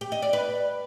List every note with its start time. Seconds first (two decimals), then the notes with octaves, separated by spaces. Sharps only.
0.01 G4
0.12 D#5
0.22 D5
0.33 B4